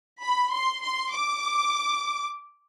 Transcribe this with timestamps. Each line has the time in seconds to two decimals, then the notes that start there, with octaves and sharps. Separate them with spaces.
0.22 B5
0.53 C6
0.82 C6
1.12 D6